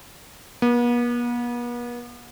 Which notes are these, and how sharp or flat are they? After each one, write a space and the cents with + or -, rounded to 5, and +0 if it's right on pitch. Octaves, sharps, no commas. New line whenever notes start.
B3 -45